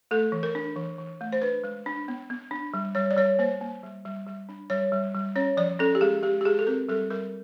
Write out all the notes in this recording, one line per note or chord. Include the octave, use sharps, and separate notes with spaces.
A3 A4
E3
A#4
D4
E3
E3
A3
C5
D4 B4
G#3
D4
B3
B3
D4
G3
G3 C#5
D5
G3 C#5
A#3 C5
A#3
G3
G3
G3
D4
G3 C#5
G3
G3
C#4 C#5
F3 D5
C#4 A4
G4
G#3 G#4
G#3 G4
G4
G#3 G#4
A4
C4 A#4
G3 A4
G3 A#4